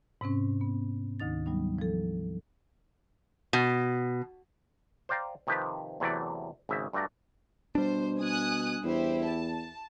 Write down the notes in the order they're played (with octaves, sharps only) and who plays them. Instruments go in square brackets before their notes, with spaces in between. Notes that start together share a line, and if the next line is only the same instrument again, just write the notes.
[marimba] G#2 C3 C4 C#4
B3
D2 D#3 D#4 A6
F#3 G3 B3 D#4
F3 A4
[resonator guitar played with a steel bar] B2
[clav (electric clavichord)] C5 D5 F5 G5 A#5
C3 D#3 F3 G4 B4
E2 C3 E3 F#3 A3 D5
G#1 C#3 E5
G2 A3 F#4 D5 A#5
[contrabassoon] B2 [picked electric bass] G3 D4 [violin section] C5
[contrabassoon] B2 [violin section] G#5 D#6 F#6
[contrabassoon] E2 [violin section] E4 G4 C5
[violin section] A5